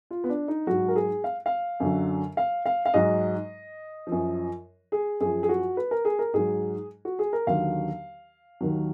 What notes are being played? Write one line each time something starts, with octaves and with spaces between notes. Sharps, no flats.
F4
B3
D4
D#4
G#2 F#3 F#4
A#4
G#4
F5
F5
F#2 D3 F#3
F5
F5
F5
G#2 F#3 D#5
F3
F#2
G#4
F#2 F3 G#4
G#4
F#4
B4
A#4
G#4
A#4
G#2 F#3 G#4
F#4
G#4
A#4
D#2 D3 F#3 F5
D#2 D#3 F#3